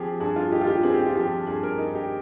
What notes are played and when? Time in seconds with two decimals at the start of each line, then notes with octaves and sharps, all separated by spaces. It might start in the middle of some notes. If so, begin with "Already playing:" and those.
Already playing: F3 C4 G4 G#4
0.20 G2 G#4
0.36 F4
0.52 D#4 G4
0.61 F4
0.67 G4
0.83 C4 G#4
0.94 G4
1.06 F4
1.15 F3 G4
1.47 G2 G#4
1.63 A#4
1.78 D#4
1.95 G4